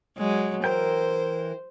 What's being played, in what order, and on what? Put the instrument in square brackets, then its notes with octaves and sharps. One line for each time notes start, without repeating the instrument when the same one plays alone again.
[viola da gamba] F#3 G#3
[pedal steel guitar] E3 A#4 G5 [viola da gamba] C5